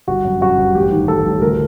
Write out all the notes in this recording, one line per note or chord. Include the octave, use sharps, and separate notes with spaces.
G1 F#4
F#2
F#2 F#4
G1
A1 G4
D#3
A1 A4
A1
D2 A#4